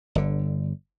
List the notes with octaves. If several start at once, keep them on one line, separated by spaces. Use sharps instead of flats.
G1 D3